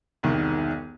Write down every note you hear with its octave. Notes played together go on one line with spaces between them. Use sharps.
E1 C2 D#3